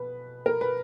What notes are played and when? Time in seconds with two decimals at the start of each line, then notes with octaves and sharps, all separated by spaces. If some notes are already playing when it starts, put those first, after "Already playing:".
Already playing: B2 B4
0.46 A#4
0.61 B4